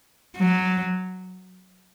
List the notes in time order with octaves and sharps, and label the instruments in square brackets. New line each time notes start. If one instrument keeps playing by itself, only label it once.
[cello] F#3